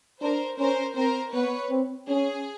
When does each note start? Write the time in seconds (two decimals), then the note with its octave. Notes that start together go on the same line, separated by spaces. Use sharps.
0.21 D4 A#4 C5
0.59 C#4 A#4 C5
0.96 C4 A#4 C5
1.33 B3 B4 C#5
1.70 C4
2.08 C#4 G#4